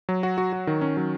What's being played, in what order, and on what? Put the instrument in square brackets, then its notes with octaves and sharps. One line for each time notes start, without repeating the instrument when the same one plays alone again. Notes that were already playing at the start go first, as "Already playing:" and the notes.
[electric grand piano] F#3
F#4
F#4
F#4
D#3
C#4
F#3